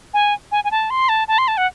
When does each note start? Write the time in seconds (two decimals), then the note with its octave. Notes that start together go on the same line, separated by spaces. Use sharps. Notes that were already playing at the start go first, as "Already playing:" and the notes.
0.14 G#5
0.52 G#5
0.64 G#5
0.71 A5
0.90 C6
1.09 A5
1.28 A5
1.38 C6
1.48 A5
1.57 F#5